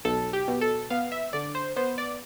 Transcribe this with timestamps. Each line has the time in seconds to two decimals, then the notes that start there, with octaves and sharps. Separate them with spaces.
0.05 B1 A4
0.33 G4
0.48 B2
0.61 A4
0.90 B3 F5
1.12 E5
1.33 D3 D5
1.55 C5
1.76 B3 C5
1.98 D5